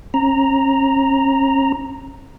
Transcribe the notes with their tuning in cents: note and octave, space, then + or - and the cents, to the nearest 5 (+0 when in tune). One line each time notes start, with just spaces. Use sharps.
C#4 -40 A#5 +0